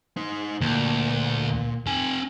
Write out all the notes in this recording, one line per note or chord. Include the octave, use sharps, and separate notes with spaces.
D#4 C5
D2 A#2
C4 G#5